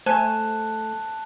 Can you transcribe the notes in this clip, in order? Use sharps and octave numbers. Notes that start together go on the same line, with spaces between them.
A3 C5 G#5 A5 F#6